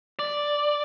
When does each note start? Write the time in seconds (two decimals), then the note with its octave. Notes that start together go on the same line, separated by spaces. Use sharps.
0.19 D5